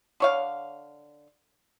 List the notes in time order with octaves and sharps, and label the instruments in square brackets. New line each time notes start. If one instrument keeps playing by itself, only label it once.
[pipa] D3 C#5 F5